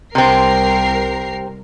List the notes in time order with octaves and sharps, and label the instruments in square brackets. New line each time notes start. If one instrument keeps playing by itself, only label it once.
[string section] C2 A#4 C7 [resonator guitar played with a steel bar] C3 C4